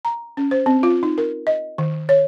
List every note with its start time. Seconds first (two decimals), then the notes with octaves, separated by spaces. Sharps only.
0.05 A#5
0.37 C#4
0.51 C5
0.66 C4
0.83 F4
1.03 D#4
1.18 A#4
1.47 D#5
1.78 D#3
2.09 C#5